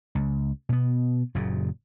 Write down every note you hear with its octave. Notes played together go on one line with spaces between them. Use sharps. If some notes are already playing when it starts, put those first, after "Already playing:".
C#2
B2 B3
F#1 A#2 C#3